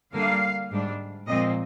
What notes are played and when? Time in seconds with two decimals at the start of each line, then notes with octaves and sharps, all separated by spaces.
0.13 D3 G3 A#3 F5
0.71 G#2 G3 D4
1.28 A#2 F3 G#3 C4 D#5